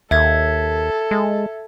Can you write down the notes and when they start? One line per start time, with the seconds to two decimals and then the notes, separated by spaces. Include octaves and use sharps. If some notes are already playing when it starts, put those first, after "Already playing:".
0.11 D#2 A4 E5 G#6
1.11 G#3